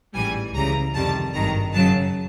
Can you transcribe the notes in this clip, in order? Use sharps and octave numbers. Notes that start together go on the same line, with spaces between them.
A1 G#2 E3 G3 G#5
C#2 C#3 E3 G3 A#5
F2 C3 D#3 G3 A5
G#1 G2 D#3 A#5
F#2 C#3 F#3 A5